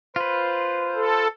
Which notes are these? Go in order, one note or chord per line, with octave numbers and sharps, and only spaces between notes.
F4 B4 C5
A4